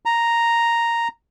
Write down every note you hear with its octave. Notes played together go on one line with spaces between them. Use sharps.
A#5